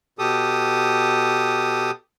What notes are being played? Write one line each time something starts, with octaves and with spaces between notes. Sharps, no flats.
B2 G4 A4 D#6